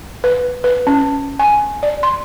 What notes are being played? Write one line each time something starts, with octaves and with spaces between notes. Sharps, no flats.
B4
B4
C#4
G#5
D5
C6